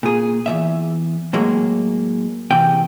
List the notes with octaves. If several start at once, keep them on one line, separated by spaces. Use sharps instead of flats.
A#2 G#4
E2 B2 E5
A2 F#3 G#3 A#3
E2 C3 G5